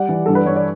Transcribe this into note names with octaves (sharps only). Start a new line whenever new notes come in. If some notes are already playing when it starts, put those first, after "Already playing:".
Already playing: G3 D5 F#5
E3
G2 A4
B4
G2 C#5
D5